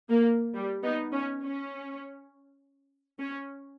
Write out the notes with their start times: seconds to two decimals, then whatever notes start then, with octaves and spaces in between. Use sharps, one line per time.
0.09 A#3
0.54 G3
0.83 B3 D#4
1.12 C#4
1.42 C#4
3.19 C#4